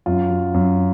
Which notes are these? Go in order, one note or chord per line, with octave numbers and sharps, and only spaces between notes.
F#2 F4
F#3
F#2